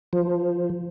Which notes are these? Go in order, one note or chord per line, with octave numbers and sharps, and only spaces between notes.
F3